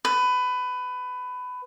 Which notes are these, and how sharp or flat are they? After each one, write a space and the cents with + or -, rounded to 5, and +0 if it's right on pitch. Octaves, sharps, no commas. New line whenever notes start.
B4 +20